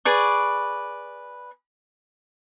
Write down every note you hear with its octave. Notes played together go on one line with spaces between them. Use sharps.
G#4 B4 D5 C#6